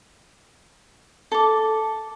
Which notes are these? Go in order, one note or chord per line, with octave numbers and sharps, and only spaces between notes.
A4 D6